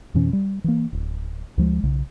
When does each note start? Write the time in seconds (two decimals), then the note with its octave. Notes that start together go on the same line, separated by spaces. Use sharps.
0.14 F2 B2 E3 C#4
0.33 G3
0.64 E3 A#3
0.93 D1
1.58 D2 F3 G#3
1.83 B1 C#3